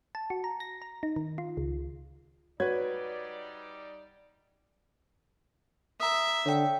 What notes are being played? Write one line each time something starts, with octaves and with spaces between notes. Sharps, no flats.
A5
F#4
A#5
A#6
A#5
D#4
D#3
F4
C#2
G3 D#4 F#4 B4 C#5 D5 G#6
E5 A#5 D#6
D3 C#5 G5